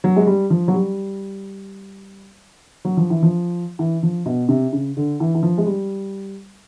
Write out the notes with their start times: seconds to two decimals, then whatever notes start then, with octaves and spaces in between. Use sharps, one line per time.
0.04 F#3
0.16 G#3
0.27 G3
0.50 F3
0.68 F#3
0.74 G3
2.85 F#3
2.97 F3
3.10 E3
3.23 F3
3.79 E3
4.03 F3
4.26 B2
4.49 C3
4.73 C#3
4.97 D3
5.20 E3
5.35 E3
5.43 F3
5.58 G#3
5.66 G3